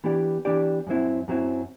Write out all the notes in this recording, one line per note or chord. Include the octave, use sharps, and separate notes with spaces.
E3 B3 D4 G4 D5
E3 B3 D4 G4 D5
F#2 F#3 C4 E4
F#2 F#3 C4 E4